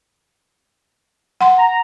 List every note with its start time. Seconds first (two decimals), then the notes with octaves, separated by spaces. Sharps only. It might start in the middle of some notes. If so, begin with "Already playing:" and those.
1.41 F#5 C6
1.58 A#5